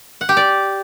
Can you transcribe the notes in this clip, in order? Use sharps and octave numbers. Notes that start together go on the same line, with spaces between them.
F#5
G4
D5